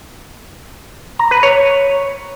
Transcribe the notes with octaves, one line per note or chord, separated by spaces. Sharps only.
A#5
B4
C#5